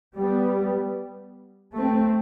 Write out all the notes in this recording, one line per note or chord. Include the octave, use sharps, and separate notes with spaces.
G3 B3
A3 C4